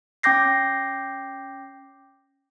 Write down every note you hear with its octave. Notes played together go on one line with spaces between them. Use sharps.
C#4 G5 D6 G6 A#6 C7